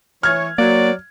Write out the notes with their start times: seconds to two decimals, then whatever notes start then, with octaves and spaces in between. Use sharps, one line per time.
0.23 E3 C#5 F6 G#6
0.58 F#3 A#3 D5